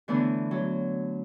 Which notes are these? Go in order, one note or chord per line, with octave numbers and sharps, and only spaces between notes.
D3 E3 A3 B3 D4
F#3